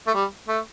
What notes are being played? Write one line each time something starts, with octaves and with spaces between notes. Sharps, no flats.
A3
G3
A3